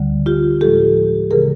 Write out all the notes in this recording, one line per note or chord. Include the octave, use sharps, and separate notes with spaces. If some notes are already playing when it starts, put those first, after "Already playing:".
Already playing: D2 D3 G3
F4 G4
A2 F3 G#3 G4 A4
C#3 E3 G#3 G#4 A#4